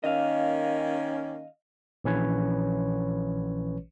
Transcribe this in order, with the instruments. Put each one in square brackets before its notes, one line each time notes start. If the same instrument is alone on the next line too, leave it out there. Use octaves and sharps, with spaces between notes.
[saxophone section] D#3 A#3 C#4 [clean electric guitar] D#5 F5
[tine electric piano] A#1 E3 C#4 B4 C#5